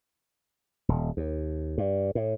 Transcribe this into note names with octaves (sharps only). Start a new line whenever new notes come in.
D#1
D#2
G2
A2